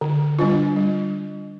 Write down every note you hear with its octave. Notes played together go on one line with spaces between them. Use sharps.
D3
G3 D4 F4
G3